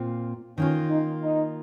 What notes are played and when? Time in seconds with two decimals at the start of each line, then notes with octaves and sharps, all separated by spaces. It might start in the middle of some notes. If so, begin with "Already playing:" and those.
Already playing: A#2 C4 F4
0.58 D#3 A#3 C#4 F4
0.90 D#4
1.23 D#4